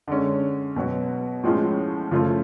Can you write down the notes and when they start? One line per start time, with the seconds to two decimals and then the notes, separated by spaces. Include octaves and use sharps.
0.08 D3 G#3 C#4
0.76 B2 F#3 B3 F#4
1.43 A2 F3 G#3 C#4 F4
2.11 C#3 F3 A3 F4